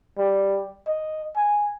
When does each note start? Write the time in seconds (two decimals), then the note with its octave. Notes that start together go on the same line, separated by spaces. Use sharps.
0.18 G3
0.87 D#5
1.36 G#5